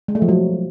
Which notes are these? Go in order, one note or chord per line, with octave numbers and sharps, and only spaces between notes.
G#3
A3
F3
F#3